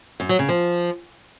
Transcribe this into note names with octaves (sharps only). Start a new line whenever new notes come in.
F#2
F#3
C#3
F3